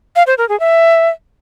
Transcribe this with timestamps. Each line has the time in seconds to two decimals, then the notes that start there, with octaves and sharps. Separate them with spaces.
0.16 F5
0.27 C5
0.38 A#4
0.49 G#4
0.60 E5